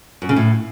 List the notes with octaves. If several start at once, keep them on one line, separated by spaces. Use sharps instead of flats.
F#2
C#3
A2